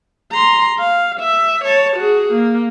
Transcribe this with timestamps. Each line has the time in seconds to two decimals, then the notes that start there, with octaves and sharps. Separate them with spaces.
0.32 A#5 C6
0.79 F5
1.20 E5
1.64 C#5 A5
1.96 F#4 G#4
2.32 A#3